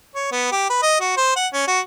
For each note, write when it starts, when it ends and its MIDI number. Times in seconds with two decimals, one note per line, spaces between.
0.15 0.29 73
0.32 0.48 59
0.52 0.68 67
0.70 0.78 71
0.83 0.97 75
1.01 1.17 66
1.17 1.36 72
1.36 1.47 78
1.54 1.66 61
1.68 1.80 66